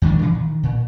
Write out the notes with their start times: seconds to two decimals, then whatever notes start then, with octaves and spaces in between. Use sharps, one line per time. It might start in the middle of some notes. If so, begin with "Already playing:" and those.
0.02 F#2 D#3 G#3 D4
0.22 A#2 E3
0.35 D#3
0.63 A#2